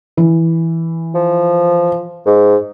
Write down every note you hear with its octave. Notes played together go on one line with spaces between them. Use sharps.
E3
F3
G#2